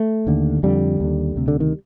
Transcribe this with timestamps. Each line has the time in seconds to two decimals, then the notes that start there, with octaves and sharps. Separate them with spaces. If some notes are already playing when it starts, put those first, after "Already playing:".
Already playing: A3
0.27 D#2 D3
0.63 F2 D3 G3
1.00 D#2 D3
1.36 D2 C3
1.48 D3
1.60 D#3